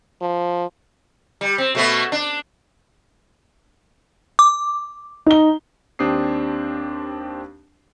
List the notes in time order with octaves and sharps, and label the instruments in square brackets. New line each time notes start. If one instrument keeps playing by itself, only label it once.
[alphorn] F3
[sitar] G3
C4
B2 A3 B3
D4
[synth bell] D6
[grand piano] D#4 G7
[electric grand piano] D#2 C4 D4 G4 D#6 C7